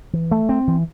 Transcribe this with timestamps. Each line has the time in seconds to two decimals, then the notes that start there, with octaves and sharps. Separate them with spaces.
0.13 E3
0.31 A3
0.49 C4
0.67 E3